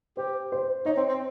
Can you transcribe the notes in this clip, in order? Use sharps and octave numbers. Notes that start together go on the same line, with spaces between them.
G4 C5
C5
D#4 C#5
C4
C4